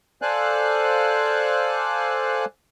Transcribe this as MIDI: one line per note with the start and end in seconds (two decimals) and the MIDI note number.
0.22 2.45 69
0.22 2.45 72
0.22 2.45 74
0.22 2.45 77
0.22 2.45 80
0.22 2.45 90